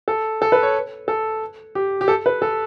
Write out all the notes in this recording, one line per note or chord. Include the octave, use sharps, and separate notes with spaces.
A4
A4
B4
C#5
A4
G4
G4
A4
B4
A4